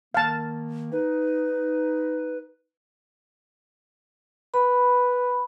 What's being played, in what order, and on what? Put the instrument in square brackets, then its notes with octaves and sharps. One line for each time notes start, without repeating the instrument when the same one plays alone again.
[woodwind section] D#3 A#3 [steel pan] F5 A5
[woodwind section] D#4 [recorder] B4
[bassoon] B4 [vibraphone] B5